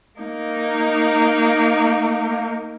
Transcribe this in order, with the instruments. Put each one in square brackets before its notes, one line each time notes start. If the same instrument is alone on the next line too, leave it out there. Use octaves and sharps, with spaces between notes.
[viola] A#3 D#4